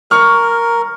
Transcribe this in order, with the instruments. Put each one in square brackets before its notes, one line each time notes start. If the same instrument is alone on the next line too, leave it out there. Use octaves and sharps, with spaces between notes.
[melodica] A#4 [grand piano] C#6 F6